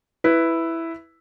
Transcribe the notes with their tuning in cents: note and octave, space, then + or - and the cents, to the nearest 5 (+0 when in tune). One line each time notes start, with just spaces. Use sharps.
E4 +0 B4 +5